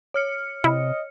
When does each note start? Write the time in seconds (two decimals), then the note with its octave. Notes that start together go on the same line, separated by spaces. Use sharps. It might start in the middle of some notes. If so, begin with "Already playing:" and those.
0.14 C#5 F6 C#7
0.64 C3 E4 D#5